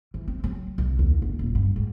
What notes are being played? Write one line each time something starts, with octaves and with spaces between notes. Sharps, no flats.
E3
C4
F#3
C2
D#2
G1
D#1
G2
G#2